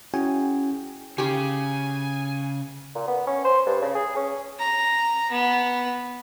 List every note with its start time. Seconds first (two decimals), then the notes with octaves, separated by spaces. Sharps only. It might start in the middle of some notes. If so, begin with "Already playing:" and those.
0.14 C#4 E4 F#4 G#4 G5 G#5
1.18 C#3 G4 G#4 G#5
2.95 A#2
3.08 B3
3.27 C#4
3.45 C5
3.67 G2
3.82 C#3
3.95 G#4
4.16 C#4
4.59 A#5
5.31 B3